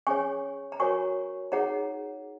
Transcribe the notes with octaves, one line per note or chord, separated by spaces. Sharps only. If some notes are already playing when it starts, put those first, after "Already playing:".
C#4 G#4 C#5 G#5 C#6
A#5
F#4 A#4 C#5 G#5 C#6
D#4 G#4 C#5 F#5 A#5